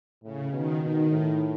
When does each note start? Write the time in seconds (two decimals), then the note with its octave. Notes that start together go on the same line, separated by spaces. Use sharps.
0.23 A2 C#3
0.52 B2 D#3
0.82 B2 D#3
1.11 A2